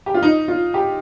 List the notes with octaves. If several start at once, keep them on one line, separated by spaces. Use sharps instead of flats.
G4
F4
D#4
F4
G4